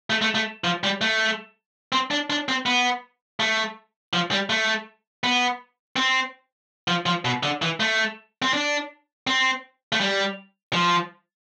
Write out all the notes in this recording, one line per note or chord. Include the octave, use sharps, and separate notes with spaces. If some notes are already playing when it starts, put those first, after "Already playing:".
A3
A3
A3
F3
G3
A3
C4
D4
D4
C4
B3
A3
F3
G3
A3
B3
C4
F3
F3
B2
D3
E3
A3
C4
D4
C4
A3
G3
F3